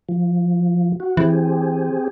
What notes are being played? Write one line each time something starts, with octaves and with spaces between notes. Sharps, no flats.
F3
F#4
E3 C4 G4 G#4